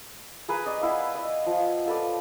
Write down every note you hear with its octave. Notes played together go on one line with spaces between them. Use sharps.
G#4 B4 G#5 A#5
D5 D#5 D#6
B3 E4 F5
D#5
F3
F4 A4 B4 D5